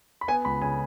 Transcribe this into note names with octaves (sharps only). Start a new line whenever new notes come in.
B5
B3 G#5
C#2 B5
C#3 G#5